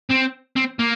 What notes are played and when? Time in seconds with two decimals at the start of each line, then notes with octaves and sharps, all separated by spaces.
0.10 C4
0.56 C4
0.79 A#3